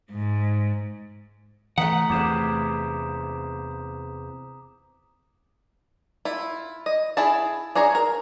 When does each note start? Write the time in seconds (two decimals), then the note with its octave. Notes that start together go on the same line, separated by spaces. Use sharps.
0.11 G#2
1.78 E3 A3 F#5 A#5 D#6 B6
2.10 E2 C3 D6 D#6 E7
6.25 E4 F4
6.86 D#5
7.17 E4 G#4 A5
7.75 D4 G#4 C#5 A#5
7.95 A#4